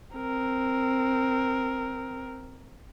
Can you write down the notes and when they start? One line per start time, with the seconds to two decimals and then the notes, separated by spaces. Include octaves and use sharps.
0.16 C4 A#4